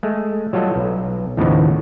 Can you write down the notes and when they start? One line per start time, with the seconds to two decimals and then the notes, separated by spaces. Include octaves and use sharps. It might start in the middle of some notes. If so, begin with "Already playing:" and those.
0.03 G#3 A3
0.53 F#3 G3 F4 A4 D#5
0.76 B1
1.37 D#2 A2 C#3 F3 B3 D#4